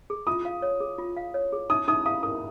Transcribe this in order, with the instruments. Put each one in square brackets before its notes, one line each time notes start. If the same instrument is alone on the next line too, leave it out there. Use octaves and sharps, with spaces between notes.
[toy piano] G#4
[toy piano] F4 [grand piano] D#6
[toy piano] F5
C#5
G#4
F4
F5
C#5
G#4
[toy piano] D#4 [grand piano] D#6
[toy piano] D#4 [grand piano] D#6
[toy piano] F5 [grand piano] D#6
[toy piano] A#4 [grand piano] D#6